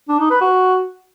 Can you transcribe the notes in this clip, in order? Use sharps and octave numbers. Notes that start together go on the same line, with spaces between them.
D4
D#4
B4
F#4